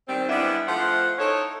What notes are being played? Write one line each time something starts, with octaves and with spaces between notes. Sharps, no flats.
D#3 G3 C4
G3 G#3 B3 D4 E4
F3 A3 C5 F#5
D#4 E4 A4 C#5